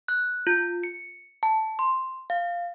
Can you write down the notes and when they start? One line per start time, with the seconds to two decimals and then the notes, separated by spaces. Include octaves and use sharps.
0.08 F#6
0.47 F4
0.84 C#7
1.43 A5
1.79 C6
2.30 F5